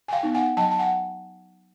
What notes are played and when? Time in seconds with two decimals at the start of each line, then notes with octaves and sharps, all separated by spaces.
0.08 G#5
0.12 F5 G5
0.23 B3 D#4
0.35 F#5 G#5
0.57 F#3 G5 A5
0.71 A5
0.79 F#5 G#5